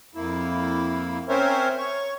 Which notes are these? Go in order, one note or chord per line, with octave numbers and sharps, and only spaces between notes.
F2 A#3 E4
C4 C#4 A#4 C5 C#5 E5
C#5 C#6